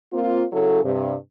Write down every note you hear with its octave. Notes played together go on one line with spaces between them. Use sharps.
A#3 C4 F4
C#3 F#3 E4 A4
G2 C3